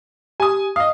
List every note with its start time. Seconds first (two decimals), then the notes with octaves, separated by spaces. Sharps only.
0.40 G4 G#5 D#6
0.76 D#5 F5 D#6